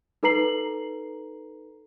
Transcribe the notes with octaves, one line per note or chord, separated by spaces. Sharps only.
D#4 A4 B4 A#5 C7 F#7